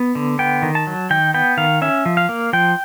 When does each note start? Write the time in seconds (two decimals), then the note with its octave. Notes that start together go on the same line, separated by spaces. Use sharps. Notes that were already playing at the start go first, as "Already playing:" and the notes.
Already playing: B3
0.15 D3
0.39 B3 G5
0.62 D#3
0.75 A5
0.87 F#3
1.10 D#3 G5
1.34 B3 G5
1.57 D#3 F5
1.82 C#4 E5
2.06 F3
2.17 F5
2.29 A#3
2.53 F3 G5